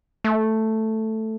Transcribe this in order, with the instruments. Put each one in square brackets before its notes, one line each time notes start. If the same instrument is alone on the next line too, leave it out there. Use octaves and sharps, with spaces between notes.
[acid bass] A3